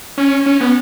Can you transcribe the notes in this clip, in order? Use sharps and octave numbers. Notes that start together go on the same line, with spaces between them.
C#4
C#4
B3